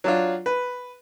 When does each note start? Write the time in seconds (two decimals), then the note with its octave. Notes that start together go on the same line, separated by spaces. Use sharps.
0.04 F#3 D4 F4
0.46 B4